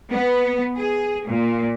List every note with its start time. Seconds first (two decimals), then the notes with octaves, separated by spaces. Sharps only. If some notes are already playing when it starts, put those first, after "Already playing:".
0.12 B3
0.77 G#4
1.28 A#2